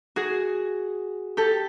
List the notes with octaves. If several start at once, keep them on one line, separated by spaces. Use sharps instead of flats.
F#4 G#4
G4 A4